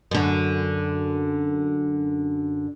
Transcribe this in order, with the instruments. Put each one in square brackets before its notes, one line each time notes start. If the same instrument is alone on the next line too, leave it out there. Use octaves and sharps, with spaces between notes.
[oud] F#2 D3